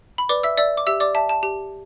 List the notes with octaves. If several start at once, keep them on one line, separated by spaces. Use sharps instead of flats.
B5
B4 D5 D6
E5 E6
D5 E5 E6
D6
G4 E5 E6
D5 D6
E5 A5
A5
G4